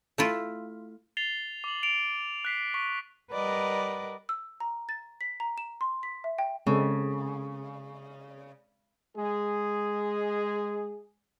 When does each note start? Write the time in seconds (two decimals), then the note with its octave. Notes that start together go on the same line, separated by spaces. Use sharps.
0.18 A3 E4 F4
1.17 A6 C7 F7 G7
1.64 D6 F#7
1.83 D7 F7
2.45 F#6 B6 C7
2.74 C#6 B6
3.32 G3 A#4 B4 D5 D#5 F#5
4.29 E6
4.60 A#5
4.89 A6
5.21 B6
5.40 A#5
5.58 E7
5.81 C6
6.03 B6
6.24 E5
6.38 G5
6.67 C#3 G#3 C4 A4
9.17 G#3 G#4